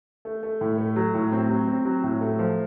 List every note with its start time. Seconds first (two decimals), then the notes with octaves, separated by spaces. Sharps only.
0.25 A3
0.43 A3
0.61 A2
0.78 A3
0.96 F#3
1.14 A2
1.32 C4
1.50 F#3
1.68 C4
1.85 F#3
2.04 A2
2.21 A3
2.39 F3